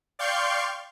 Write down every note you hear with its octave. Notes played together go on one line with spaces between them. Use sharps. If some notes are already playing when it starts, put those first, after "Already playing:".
D5 F5 G5 C6 C#6 G6